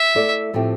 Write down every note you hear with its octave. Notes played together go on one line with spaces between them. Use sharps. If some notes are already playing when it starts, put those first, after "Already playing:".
Already playing: E5
A3 E4 A4 D5
A2 F3 A3 C4 G4